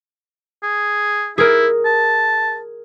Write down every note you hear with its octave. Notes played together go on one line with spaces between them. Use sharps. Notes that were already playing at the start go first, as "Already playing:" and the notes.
G#4
E4 G#4 A#4
A5